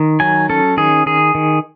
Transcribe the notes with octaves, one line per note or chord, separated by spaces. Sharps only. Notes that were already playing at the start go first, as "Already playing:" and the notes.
Already playing: D#3
F#3 G#5
C#4 A4
D#3 G#4
D#3 G#4
D#3